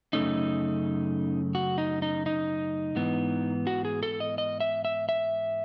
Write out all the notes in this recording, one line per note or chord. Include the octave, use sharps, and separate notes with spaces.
F#2 C#3 E3 A3 C#4 D#4
F#4
D#4
D#4
D#4
G#2 E3 B3
F#4
G#4
A4
D#5
D#5
E5
E5
E5